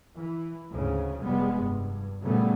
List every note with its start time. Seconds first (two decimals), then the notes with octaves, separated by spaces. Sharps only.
0.17 E3
0.70 D2 G#2 C#3
1.22 F1 G3 G#3 B3
1.55 G2
2.23 A#2 C#3 G3 A3 B3